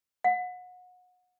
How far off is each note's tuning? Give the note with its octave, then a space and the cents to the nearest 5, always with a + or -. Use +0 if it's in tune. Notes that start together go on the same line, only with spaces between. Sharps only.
F#5 -30